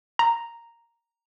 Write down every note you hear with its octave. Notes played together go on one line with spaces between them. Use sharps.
A#5